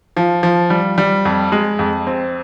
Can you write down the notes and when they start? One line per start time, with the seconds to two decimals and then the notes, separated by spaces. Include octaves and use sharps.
0.17 F3
0.43 F3
0.70 G3
0.98 G3
1.25 F2
1.52 G#3
1.79 F2
2.07 C4